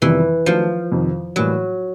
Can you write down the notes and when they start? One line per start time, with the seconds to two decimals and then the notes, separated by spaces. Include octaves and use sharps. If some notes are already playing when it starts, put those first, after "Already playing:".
0.02 F2 C3 D#3 E3 G3 B3
0.46 D#3 F3 F#3 A3 D4
0.92 F2 C3 D#3
1.36 A2 E3 F#3 G3 A#3